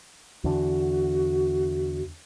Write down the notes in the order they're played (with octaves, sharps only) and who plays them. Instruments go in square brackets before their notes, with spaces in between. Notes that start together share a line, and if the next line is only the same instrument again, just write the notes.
[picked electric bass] E2 D3 [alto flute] F#4